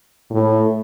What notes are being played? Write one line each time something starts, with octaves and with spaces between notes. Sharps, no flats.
A2